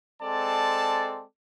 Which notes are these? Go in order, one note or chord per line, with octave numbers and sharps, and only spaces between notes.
G#3 C4 A4 D5 A5